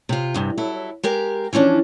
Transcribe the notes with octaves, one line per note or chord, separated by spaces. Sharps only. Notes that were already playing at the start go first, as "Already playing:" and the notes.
C3 F4
E2 G2 C3
F#3 E4 A4
G#3 G4 A#4 F5
E3 F3 C#4 D4